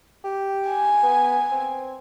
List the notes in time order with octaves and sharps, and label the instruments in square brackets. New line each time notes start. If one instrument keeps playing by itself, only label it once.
[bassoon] G4
[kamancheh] G#5
[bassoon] B3
C4